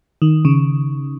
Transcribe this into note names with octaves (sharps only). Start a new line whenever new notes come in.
D#3
C#3